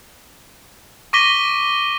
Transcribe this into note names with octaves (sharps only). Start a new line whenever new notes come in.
C#6 D6 A#6 B6 D#7 G7